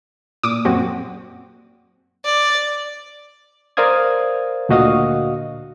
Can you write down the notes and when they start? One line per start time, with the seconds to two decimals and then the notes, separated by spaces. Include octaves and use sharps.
0.43 A#2 D6 D#6
0.65 F#2 C4 F#4
2.25 D5
3.77 A#4 C5 D5 F5 D#6 G#6
4.69 D2 A#2 F#4 D#5 F5 D#6